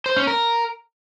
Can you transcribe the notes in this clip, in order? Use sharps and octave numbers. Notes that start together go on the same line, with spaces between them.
C5
C#4
A#4